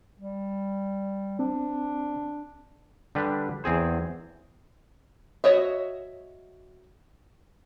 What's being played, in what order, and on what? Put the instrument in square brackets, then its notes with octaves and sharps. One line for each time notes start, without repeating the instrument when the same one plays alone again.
[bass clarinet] G3
[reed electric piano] C4 [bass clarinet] D4
[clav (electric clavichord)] D3 G3 D4 G4 B4
E2 C4 G#4 C5
[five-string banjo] F#4 C#5 D#5 E5